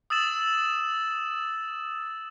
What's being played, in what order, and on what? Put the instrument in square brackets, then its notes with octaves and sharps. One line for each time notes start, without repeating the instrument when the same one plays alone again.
[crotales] D#6 E6 A6 E7 F#7